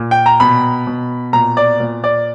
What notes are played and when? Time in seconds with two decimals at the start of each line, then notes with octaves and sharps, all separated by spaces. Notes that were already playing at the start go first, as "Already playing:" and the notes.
Already playing: A#2
0.11 G5
0.26 A#5
0.40 B2 B5
0.87 B2
1.33 A#2 A#5
1.57 D5
1.80 A#2
2.04 D5